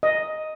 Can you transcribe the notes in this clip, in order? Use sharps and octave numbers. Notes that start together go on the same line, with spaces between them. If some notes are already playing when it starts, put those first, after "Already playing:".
D#5